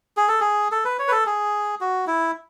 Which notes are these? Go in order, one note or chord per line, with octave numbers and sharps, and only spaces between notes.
G#4
A4
G#4
A4
B4
C#5
B4
A4
G#4
F#4
E4